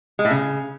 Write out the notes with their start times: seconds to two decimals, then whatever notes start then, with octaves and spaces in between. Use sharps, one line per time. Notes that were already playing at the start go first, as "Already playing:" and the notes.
0.19 G#3
0.25 A2
0.31 C#3